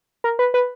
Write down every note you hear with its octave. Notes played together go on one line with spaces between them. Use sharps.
A#4
B4
B4